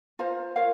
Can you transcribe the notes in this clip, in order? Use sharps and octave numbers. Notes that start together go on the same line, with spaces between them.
F4 C5 F5 A#5
F4 A#4 C#5 F5